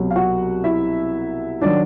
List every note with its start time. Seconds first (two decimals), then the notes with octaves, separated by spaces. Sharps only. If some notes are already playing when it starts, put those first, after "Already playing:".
Already playing: C2 B2 F#3
0.11 F5
0.15 F#4 F#5
0.64 E4 E5
1.61 D#3 F#3 D4 D5